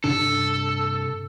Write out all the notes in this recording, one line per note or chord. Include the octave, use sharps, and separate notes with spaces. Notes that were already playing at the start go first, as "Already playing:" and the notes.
G2 C3 D4 A4